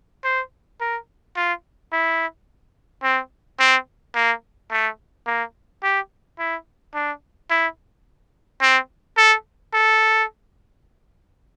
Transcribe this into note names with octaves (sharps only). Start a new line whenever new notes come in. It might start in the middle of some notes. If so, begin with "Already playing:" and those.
C5
A#4
F4
E4
C4
C4
A#3
A3
A#3
G4
E4
D4
E4
C4
A4
A4